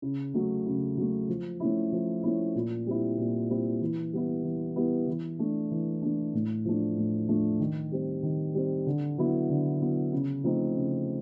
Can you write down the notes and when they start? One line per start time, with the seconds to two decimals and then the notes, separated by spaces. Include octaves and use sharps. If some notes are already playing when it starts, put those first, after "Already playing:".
0.02 C#3
0.34 F#3 A3
0.66 C#3
0.97 F#3 A3
1.29 F3
1.60 A3 C#4 E4
1.92 F3
2.23 A3 C#4 E4
2.55 A#2
2.87 G3 C4 E4
3.18 A#2
3.49 G3 C4 E4
3.81 E3
4.13 G3 B3 E4
4.44 E3
4.76 G3 B3 E4
5.08 E3
5.39 A3 D4
5.71 E3
6.02 A3 D4
6.34 A2
6.65 F3 A3 D4
6.97 A2
7.28 F3 A3 D4
7.60 D#3
7.92 G3 C4
8.23 D#3
8.54 G3 C4
8.87 D3
9.18 F#3 B3 E4
9.49 D3
9.81 F#3 B3 E4
10.13 C#3
10.44 F3 A3 C4 D#4
10.75 C#3